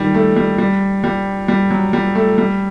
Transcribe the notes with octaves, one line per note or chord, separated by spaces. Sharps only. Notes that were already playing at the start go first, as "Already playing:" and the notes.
Already playing: D#3 G3
A3
G3
G3
G3
G3
F#3
G3
A3
G3